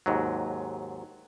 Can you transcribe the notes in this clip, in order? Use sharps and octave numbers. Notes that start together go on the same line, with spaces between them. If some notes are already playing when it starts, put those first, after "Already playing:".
D#2 G#2 F#3